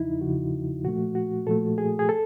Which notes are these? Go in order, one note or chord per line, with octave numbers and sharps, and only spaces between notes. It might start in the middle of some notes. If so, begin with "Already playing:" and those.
Already playing: E2 C#3 F3 D#4 E4
E2 C#3 F3 F#4
A#2 F3 A3 F#4
F#4
A#2 F3 A3 A4
G#4
G#4
A4